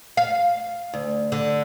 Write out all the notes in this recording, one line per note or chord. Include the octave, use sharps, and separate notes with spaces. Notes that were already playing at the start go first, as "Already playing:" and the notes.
F5
D2
D3